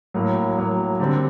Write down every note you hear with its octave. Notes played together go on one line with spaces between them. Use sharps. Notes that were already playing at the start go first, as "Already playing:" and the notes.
A2 F#3 A#3
A2 F#3 A#3
D3 G3 C4